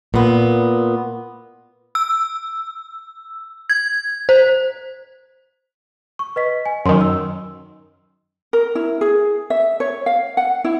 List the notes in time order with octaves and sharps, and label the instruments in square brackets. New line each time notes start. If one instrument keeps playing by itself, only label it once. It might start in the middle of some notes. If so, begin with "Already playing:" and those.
[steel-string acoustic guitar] A#2 B3
[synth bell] E6
G#6
C5
[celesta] C#6
B4 D#5 B6
G#5
[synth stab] F#2 D#3 [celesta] C6
[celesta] E6
[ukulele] A#4
E4
G#4
E5
C#5
F5
F#5
E4